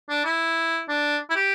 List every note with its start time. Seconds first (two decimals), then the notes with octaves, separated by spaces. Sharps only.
0.09 D4
0.25 E4
0.89 D4
1.30 E4
1.36 G4